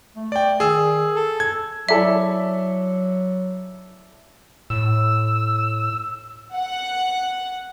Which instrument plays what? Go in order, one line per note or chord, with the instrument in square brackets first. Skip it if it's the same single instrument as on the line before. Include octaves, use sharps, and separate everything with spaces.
[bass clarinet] A3
[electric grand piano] D5 G5
[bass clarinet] D#3 [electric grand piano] G#4 E6
[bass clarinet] A4
[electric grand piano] G#6
[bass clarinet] F#3 [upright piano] E4 A4 D5 [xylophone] E5
[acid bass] A2 [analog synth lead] E6
[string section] F#5